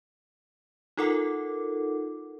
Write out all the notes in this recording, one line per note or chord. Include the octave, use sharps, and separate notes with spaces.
D#4 F4 A4 A#4 F#5 D6